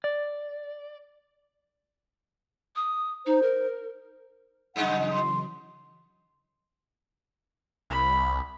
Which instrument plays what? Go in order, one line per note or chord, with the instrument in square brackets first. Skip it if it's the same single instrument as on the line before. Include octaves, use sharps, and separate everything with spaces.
[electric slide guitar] D5
[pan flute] D#6
[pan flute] D#4 [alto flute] C5
[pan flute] A#4
[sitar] F#2 G#3 D#4 [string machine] C#3 E3 F#3 [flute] F#5
[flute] C6
[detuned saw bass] C2 [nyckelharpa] B5